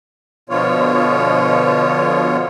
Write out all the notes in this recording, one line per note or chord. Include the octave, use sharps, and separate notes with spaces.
B2 D3 F3 B3 F4 C#5